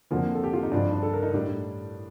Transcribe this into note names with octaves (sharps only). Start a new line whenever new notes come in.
F2 D3 F3 A#3
A4
G4
F4
D#4
G2 F3 D4
D4
A4
A#4
D#4
A2 G3 D4